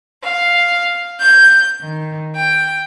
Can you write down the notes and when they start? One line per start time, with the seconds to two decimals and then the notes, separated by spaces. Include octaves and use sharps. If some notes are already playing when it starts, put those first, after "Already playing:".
0.23 F5
1.20 G6
1.80 D#3
2.36 G5